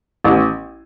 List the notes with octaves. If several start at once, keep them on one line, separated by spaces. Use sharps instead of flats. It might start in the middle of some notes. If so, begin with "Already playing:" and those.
A1